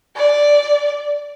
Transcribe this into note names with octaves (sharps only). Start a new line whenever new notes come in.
D5